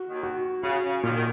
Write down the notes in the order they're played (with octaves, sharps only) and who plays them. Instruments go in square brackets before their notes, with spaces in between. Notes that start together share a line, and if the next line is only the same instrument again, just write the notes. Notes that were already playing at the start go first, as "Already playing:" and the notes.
Already playing: [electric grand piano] F#4
[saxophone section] D#2 D#3
[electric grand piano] F#4
[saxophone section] C#3 [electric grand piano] F#4
[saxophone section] C#3
[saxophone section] D#2 D#3 [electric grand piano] A#2
[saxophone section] D#3